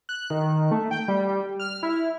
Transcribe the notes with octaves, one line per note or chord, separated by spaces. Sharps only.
F#6
D#3
A3
G5
G3
F6
E4